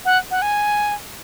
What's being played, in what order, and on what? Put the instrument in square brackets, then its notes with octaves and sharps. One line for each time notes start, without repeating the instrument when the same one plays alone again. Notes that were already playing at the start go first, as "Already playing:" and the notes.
[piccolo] F#5
F#5
G#5